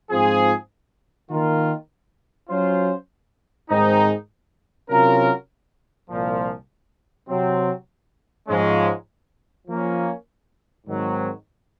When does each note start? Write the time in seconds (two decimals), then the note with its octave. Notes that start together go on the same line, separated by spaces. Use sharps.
0.11 G#2 F3 C4 F4 G#4
1.30 D#3 A#3 F4 A#4
2.49 F#3 C#4 F4 C5
3.69 G#2 D#3 G#3 C4 D#4
4.89 C3 F#3 C#4 F4 A#4
6.09 C2 A#2 F3
7.29 C3 F#3 C4
8.47 G#2 F3 G#3 C#4
9.67 F3 A#3 C#4
10.87 G#2 D#3 F#3 C4